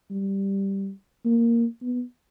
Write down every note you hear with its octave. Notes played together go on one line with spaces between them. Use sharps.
G3
A#3
B3